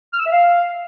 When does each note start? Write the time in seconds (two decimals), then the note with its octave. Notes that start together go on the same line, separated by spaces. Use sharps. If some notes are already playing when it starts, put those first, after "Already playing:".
0.13 F6
0.19 E6
0.25 E5
0.31 F5